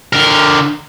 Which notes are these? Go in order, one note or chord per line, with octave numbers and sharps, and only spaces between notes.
D3 A#4